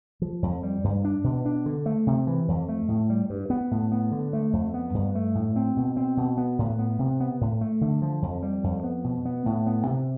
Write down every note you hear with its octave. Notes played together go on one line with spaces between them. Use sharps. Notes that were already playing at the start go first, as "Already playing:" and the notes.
F3
F2
G3
G2
D4
B2
D4
D3
A3
C3
E3
F2
A3
A2
G3
G2
B3
A2
B3
D3
A3
F2
B3
G2
A3
A2
C4
B2
C4
B2
B3
A2
B3
C3
B3
A2
A3
D3
F3
F2
G3
F2
B3
B2
B3
A2
B3
C3